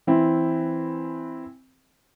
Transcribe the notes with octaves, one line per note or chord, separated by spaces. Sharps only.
E3 C4 E4